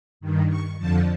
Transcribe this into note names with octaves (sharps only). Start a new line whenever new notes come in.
G2 D#3
C#6
F2 D3 F3 A5